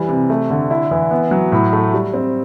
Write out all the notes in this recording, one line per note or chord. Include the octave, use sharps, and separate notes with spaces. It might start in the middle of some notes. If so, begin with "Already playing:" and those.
Already playing: E3 G3
C3
A3
D3
E4
E3
B3
F#3
A2
A3
G3
C4